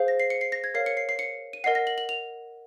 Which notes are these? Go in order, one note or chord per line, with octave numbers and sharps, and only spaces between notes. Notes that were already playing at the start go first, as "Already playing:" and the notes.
Already playing: G#4 C5 F5
A#6
C7
C#7
C7
A#6
G#6
A#4 C#5 F5 C7
C#7
C7
C7
C#7
D#7
A#4 D#5 F#5 C7
A#6
F#7
F#7
F7